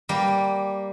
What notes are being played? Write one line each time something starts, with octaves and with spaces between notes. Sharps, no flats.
G3 A#3